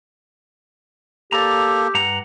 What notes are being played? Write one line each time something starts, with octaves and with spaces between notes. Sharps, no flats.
A#3 G4 A4 D5 A#5
G2 F#5 A#5